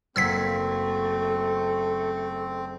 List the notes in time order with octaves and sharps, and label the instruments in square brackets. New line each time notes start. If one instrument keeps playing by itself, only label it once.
[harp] F#1 A#3 [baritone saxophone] A3 [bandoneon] C4 [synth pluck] E6 G#6 B6